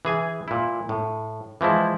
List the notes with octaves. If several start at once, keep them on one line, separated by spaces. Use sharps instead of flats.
E3 G#4 G#5
A#2 E4
A2
E3 F3 G#3 E4